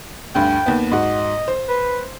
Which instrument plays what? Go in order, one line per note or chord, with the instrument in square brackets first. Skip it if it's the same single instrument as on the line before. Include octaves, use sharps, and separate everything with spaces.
[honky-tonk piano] D2 G2 [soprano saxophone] G5
[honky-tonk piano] D#2 B3
[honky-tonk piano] G#2 F#4 [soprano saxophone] D#5
[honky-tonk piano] C5
[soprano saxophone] B4